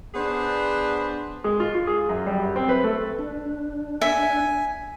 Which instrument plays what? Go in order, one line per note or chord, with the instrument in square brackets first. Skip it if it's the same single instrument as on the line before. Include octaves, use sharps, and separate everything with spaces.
[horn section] B3 D4 G#4 C5
[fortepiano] G#3
F4
F4
G#4
F#2
G3
F#2
C4
B4
A3
[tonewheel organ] D4
[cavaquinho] E5 [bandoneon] G#5